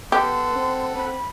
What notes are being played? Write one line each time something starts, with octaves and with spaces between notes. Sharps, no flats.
B3 G4 A4 F#5 C6
C4
C4 B5